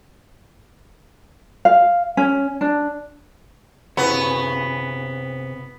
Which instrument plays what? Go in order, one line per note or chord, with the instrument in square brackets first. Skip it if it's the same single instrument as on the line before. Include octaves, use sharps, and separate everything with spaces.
[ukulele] F5
C#4
D4
[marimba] F#2 E4 B4 [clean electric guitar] C3 G#4 C#5 [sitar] B3